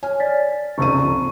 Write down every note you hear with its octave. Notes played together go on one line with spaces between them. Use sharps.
C#5 G#5 F6
D5 A6 B6
F1 C#2 C#6 D#7
F2